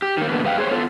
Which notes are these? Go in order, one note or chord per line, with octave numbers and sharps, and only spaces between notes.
G4
D#3 A#3
B2 D3 E3 A#3 B3
G2 B4 F5 G5
A3 G#4 A4 C5 C#5
B3 F4 A4